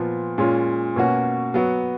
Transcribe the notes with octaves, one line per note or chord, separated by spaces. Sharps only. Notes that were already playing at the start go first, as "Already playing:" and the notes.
Already playing: A#2 F3 B3 F4
A#2 G#3 C#4 F4
B2 A#3 C#4 F#4
F#3 B3 F#4